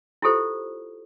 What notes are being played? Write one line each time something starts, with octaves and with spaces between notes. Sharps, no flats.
E4 F4 G4 A4 C5